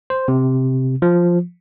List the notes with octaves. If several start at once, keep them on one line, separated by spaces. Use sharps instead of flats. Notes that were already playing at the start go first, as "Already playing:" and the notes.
C5
C3
F3